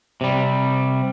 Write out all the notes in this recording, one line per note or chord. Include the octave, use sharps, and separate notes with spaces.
C3 G3